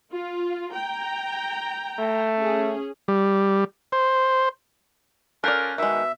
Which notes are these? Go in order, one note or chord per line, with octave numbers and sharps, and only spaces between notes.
F4
G5 A#5
A3
C#4 G#4
G3
C5
C#4 F4 A4 A#4 D5 F#6 G6
B2 D#3 G#3 E5